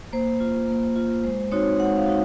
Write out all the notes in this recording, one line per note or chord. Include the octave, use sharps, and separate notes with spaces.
A#3 C5
F4
A#3
F4
G#3 C5
C4 D#4 F#4 C#5
G#3 F#5
F5
D#4 F#4